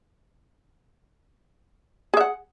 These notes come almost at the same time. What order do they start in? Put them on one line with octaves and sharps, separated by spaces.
G#4 E5 F#5